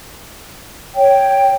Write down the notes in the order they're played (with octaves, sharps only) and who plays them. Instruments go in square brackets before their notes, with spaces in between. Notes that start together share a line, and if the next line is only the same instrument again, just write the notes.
[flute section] C#5 G5